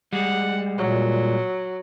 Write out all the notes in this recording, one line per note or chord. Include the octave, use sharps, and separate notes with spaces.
G3 G#3 F#5
A#2 F#3